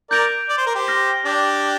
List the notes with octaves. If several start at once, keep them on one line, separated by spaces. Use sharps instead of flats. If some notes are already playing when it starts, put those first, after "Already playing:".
A#4 D5 G6 D7 F7
D5
C5
A#4
G4 C5
F6 A#6 G7
D4 G4